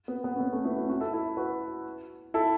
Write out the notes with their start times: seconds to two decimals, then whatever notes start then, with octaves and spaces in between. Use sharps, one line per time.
0.08 B3
0.24 B3
0.36 C#4
0.40 B3
0.53 A3 C#4
0.65 B3 E4
0.77 C#4 F#4
0.89 C#4 F#4
1.01 E4 A4
1.13 E4 A4
1.37 F#4 B4
2.34 E4 A4